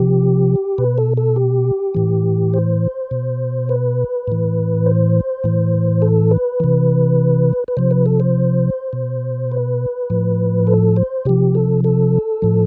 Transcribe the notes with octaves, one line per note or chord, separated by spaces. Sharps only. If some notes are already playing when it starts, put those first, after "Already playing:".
Already playing: C3 F3 G4
B2 B4
A4
A4
G4
A2 E3
C5
B2
B4
A2 E3
C5
A2 E3
A4
B4
C3 E3
B4
C3 F3 C5
B4
A4
C5
B2
B4
A2 F3
A4
C5
C3 F3 G4
A4
A4
A2 F3